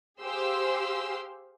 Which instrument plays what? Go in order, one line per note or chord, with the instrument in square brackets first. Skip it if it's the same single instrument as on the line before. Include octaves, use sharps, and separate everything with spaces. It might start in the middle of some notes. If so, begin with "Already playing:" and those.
[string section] G4 G#4 C5 F5 C6 E6